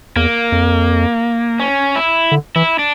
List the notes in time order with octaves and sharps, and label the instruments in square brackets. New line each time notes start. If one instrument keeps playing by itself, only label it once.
[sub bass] E2 [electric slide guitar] A#3
[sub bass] F2
[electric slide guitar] C#4
E4
[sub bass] D3
[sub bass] E3 [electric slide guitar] E4
[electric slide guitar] D4